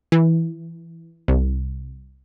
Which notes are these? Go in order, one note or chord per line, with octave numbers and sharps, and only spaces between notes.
E3
C2